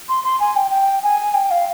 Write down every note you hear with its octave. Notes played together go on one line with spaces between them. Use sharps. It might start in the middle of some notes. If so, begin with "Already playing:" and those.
C6
C6
G#5
G5
G5
G#5
G5
F5